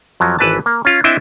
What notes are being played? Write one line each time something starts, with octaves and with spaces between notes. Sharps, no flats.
F2 F3 F#3
G#1 E3 B4 D5 A5
A#3
C#4 F4
C4 D4 E4 D#5 E5 G5